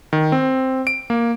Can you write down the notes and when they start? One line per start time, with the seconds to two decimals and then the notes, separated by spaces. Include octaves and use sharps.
0.13 D#3
0.32 C4
0.87 D7
1.10 A#3